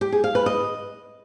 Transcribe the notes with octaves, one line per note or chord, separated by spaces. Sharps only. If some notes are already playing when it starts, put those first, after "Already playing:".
G4
G#4
F5
B4
D#5